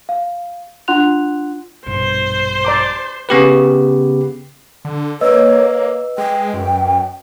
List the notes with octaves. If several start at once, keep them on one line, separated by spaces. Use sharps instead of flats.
F5
D4 F4 F#5 C6 F#6 F7
A#1 G2 B2 C5
D5 A#5 D6
C#3 B3 G4 B4
D3
A#3 B4 C#5 D#5 E6
G#3 G5
F#2